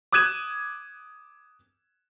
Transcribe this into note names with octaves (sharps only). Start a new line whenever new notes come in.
D6 D#6 F#6 G#6 D#7 E7